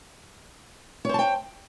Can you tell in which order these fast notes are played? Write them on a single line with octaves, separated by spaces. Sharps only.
C#5 C5 A5 G5